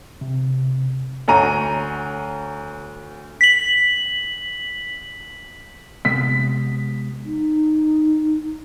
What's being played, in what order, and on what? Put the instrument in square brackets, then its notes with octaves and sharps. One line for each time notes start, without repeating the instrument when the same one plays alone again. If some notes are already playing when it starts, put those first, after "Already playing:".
[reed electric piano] C3
[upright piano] D2 C#5 G#5 A#5 D#7
[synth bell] B6 F#7
[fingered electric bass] C3 G#3 B3 [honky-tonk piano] B6
[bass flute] D#4